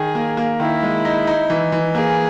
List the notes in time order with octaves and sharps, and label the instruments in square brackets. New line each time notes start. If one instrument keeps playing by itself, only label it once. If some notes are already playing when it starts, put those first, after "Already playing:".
Already playing: [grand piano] D#3 [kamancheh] G#4
[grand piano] A#3
A#3
[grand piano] D#3 [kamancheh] E4
[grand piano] G#3
D#4
D#4
E3
E3
[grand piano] A#3 [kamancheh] G#4